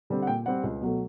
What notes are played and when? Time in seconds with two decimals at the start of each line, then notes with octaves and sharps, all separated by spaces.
0.10 D3 G3 C4
0.22 F#5
0.27 A#2 G5
0.46 G3 C4 F#5
0.63 C#2
0.81 B2 F#3 A3